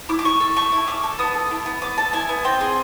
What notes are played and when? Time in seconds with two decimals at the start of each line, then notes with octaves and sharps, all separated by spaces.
0.09 E4 D6
0.19 D6
0.25 C#4 C#6
0.40 A4
0.56 A3 C#6
0.72 E4
0.88 C#4 D6
1.03 A4
1.19 B3 D#6
1.35 A4
1.51 E4
1.66 B3
1.82 B3 D6
1.97 A4 A5
2.13 E4 G#5
2.29 B3
2.44 C4 G5
2.61 G#4